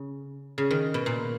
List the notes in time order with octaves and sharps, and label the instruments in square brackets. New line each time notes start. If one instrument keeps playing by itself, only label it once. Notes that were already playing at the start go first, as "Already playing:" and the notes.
Already playing: [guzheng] C#3
C#3
D#3
B2
A#2